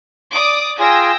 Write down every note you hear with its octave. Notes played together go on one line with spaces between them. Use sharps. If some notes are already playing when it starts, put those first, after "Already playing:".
D5 D6 D#6
F4 G#4 G5 G#5 E6 A#6